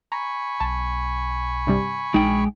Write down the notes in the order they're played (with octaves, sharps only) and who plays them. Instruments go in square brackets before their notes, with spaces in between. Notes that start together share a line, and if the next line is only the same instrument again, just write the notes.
[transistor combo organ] G#5 B5 C#6 [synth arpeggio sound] A#5
[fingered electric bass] B1 [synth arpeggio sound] A5
[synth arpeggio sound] G2 C3 G3
[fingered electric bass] A#1 D4 [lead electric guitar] G#3 G5 [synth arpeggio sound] D#4